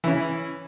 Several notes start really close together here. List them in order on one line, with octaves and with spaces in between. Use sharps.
E3 C#4 E4